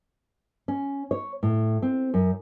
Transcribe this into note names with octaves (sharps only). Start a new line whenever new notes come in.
C#4
C#5
A2
C4
F#2